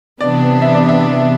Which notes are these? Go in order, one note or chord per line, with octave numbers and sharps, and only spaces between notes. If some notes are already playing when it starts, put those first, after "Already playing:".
C3 E3 B3 D4 D5
E5
D5
E5